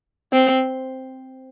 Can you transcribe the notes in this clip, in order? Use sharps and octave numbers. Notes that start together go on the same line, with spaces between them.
C4